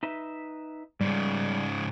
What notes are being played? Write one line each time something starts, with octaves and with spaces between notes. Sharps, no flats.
D#4 B4 E5
G#2 C#3 G3